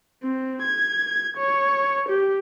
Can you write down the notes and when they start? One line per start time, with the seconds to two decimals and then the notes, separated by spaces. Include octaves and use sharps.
0.23 C4
0.62 G#6
1.37 C#5
2.08 G4